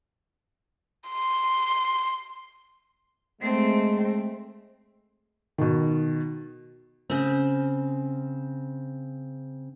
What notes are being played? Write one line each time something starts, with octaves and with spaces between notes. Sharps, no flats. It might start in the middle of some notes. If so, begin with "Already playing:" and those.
C6
G#3 A3 C4
B2 D#3
C#3 C4